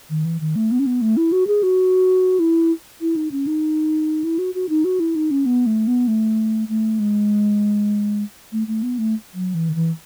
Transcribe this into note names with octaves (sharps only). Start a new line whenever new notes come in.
D#3
E3
D#3
A3
B3
C#4
B3
A3
E4
F#4
G#4
F#4
E4
E4
D#4
C#4
D#4
E4
F#4
F#4
D#4
F#4
E4
D#4
C#4
B3
A3
B3
A3
A3
G#3
A3
A3
B3
A3
F#3
E3
D#3
E3